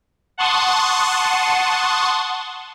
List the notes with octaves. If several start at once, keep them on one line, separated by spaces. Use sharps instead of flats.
F#5 A5 C6 C#6 D#6